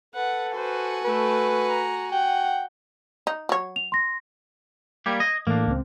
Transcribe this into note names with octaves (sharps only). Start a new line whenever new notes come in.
A4 B4 F#5
F#4 B4 C5 G#5
A3 A4 B4
A#5
F#5 G5
D#4
F#3 C#5
F7
C6 A#6
G3 A#3 G4 G#6
D#5
A2 E3 A#3 D4
C#2 C4